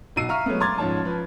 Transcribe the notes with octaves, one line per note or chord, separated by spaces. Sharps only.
B1 D#4 F#4 E6 C7 D#7
E5 F5 A#5 C#6 F6
F#3 G#3 A3 B3
A#5 C6 D6 G#6 A6
C#2 G#2 F3 C#5 A5
F3 B4